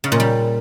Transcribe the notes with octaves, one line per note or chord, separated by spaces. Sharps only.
C#3
A#2
G3